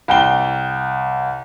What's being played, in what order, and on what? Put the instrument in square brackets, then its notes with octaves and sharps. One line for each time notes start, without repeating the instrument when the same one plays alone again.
[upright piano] C2 G5 G7